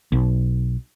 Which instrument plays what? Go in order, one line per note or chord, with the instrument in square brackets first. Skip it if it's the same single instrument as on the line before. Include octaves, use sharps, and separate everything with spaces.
[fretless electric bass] B1